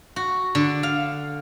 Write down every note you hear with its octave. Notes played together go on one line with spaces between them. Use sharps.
F#4
D3
F5